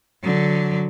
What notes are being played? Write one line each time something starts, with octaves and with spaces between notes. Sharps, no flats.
D3 F#3